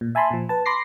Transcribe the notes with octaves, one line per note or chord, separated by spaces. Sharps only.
A#2
E5 G#5 A5 B5 C6
A#2 F3
B4 A5
B5 C6 D6 A#6 C7